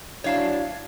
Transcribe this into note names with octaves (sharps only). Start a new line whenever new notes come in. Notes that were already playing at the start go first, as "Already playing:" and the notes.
F#3 D4 E4 C#5 F5 A5